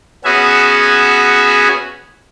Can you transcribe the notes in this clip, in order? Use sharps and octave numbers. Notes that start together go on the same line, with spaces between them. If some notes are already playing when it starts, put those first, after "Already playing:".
B3 C#4 F#4 G#4 E5 G#5